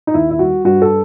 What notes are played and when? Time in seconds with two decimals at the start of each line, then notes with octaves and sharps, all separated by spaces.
0.07 D#4
0.14 D#2 E4
0.30 E4
0.39 G3 F#4
0.65 G2 F#4
0.82 A4